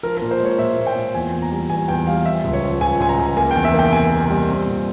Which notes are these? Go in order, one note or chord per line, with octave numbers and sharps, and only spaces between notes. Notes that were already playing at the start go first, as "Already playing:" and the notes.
F3 A#4
A#2 A#4
C5
G#3 C#5
A#2 E5
A#2
G5
A#2
E2 G#5
E2
A#5
G3
E2 G#5
E2 G5
G3 F5
F3 E5
C#2
C#5
F3
C#2 G#5
C#2 G#5
A#5
C#2
A#3 G#5
E2 G5
E5
A#3 G5
C3 G#5
A#3
G3
C4
A#2